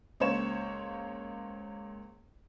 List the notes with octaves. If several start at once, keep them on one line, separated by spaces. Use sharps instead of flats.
C#2 A#3 C5 C#5 E7